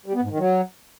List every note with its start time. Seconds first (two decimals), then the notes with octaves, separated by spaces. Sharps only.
0.06 G3
0.14 B3
0.22 G#2
0.31 D#3
0.39 F#3